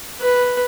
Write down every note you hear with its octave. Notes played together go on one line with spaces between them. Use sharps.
B4